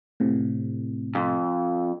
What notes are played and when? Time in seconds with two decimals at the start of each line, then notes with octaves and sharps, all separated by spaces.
0.20 A2 C3
1.15 F2